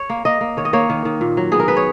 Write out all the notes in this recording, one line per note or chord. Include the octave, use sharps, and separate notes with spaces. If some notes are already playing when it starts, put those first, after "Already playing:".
Already playing: C#5
A#3
A#3 D#5
A#3
D#3 C#5
D#5
A#3 C#5
D#3
D#3
A#2
F#3
B3 G#4
A#4
B3 B4
C#5